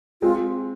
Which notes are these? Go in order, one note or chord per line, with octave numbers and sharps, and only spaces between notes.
G#3 C4 F4